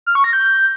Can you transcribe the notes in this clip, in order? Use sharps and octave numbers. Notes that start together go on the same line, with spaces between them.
F6
C#6
A#6
G6